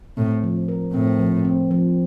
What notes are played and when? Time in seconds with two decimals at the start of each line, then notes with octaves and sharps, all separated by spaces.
0.17 A2 C4
0.44 F3
0.68 A#4
0.94 A2 C4
1.19 F3
1.45 C4
1.71 F3